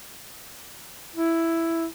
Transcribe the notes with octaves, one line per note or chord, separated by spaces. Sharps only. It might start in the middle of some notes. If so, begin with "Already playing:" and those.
E4